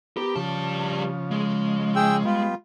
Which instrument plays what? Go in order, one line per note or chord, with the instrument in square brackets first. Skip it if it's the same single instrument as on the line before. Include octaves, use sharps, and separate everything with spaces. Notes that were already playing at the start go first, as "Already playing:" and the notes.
[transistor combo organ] B3 A#4 [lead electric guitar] G4
[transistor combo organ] C#3 F3 [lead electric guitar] G3 A5
[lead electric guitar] G#3
[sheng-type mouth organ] G#4 G5 E6
[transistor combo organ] G3 B3 [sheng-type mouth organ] F4